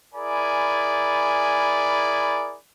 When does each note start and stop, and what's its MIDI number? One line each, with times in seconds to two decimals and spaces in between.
0.14 2.57 64
0.14 2.57 68
0.14 2.57 70
0.14 2.57 74
0.14 2.57 80
0.14 2.57 83